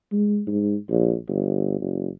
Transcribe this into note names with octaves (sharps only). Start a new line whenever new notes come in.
G#3
G#2
A#1
G1
F#1